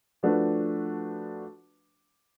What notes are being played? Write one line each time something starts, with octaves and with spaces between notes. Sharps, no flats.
F3 A3 D4 F#4 B4